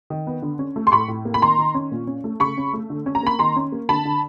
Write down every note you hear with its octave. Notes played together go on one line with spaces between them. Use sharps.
D#3
B3
D3
C#4
A3
C6
A2 B5 C#6
A2
A#3
B5
D#3 A#5 C6
D#3
C#4
A#2
C#4
A3
C#3 B5 C#6
C#4
A3
D3
C#4
A#5
A#3 B5
D#3 A#5 C6
C#4
A#3
D3 A5 B5
D3